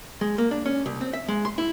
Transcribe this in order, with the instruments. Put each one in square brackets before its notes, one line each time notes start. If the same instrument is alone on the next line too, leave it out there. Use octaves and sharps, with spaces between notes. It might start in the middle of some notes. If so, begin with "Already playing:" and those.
[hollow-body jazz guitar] G#3
A#3
D4
C#4
C2
C4
E5
G#3
C6
E4